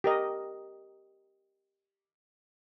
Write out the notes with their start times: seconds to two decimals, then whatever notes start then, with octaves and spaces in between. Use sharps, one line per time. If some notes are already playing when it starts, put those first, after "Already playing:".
0.04 G4 A#4 D#5